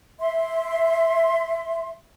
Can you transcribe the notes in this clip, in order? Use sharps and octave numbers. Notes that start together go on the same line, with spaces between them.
E5 C6